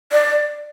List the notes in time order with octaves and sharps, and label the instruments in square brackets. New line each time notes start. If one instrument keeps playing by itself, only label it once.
[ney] D5